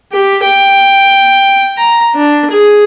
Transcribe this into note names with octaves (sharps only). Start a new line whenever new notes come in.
G4
G5
A#5
D4
G#4